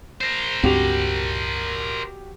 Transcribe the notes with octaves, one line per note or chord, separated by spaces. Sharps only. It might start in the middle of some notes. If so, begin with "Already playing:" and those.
A#4 C5
C#2 G2 C4 F#4 G4 F7